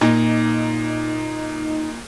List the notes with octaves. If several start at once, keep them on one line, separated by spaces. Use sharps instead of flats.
A#2 D#4